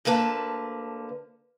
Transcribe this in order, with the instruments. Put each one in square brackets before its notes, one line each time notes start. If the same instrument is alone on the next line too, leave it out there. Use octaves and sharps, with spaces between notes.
[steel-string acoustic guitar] D2 D3 A#3 B4 A5